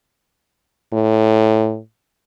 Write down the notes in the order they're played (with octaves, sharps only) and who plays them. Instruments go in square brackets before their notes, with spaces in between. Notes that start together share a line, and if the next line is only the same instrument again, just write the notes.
[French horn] A2